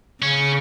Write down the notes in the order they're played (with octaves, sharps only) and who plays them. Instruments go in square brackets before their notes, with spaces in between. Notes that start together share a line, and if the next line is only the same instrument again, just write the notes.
[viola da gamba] C#3 [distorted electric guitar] C#4